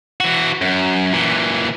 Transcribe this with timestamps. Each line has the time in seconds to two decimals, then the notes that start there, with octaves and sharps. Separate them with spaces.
0.20 E3 F#4
0.62 F#2
1.13 A#2 E3